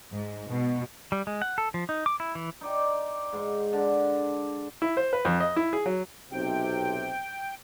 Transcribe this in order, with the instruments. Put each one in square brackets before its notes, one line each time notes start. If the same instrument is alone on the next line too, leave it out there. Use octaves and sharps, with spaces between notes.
[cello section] G#2
B2
[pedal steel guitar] G3
G#3
F#5
A4
F3
D#4
D6
E4
E3
[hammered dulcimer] D#4 D5 G5
G#2 C6
D3
[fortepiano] E4
C5
B4
F2
D#5
E4
G#4
F#3
[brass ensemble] B1 C3 [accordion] G5